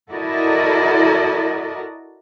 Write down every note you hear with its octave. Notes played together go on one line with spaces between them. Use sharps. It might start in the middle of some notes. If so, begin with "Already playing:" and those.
E4 F#4 A4 A#4 D5 D#5